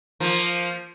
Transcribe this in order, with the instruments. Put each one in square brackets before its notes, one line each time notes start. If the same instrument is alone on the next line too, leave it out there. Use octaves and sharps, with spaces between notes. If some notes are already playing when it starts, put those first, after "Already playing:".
[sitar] F3 A#3